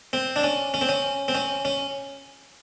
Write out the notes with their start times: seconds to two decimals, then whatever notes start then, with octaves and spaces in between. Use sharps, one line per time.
0.13 C4
0.36 D4
0.44 C#4
0.74 C#4
0.81 C4
0.89 C#4
1.28 C4
1.35 C#4
1.65 C#4